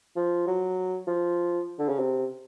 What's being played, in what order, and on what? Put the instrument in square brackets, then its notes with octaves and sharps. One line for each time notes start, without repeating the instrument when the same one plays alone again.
[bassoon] F3
F#3
F3
D3
C#3
C3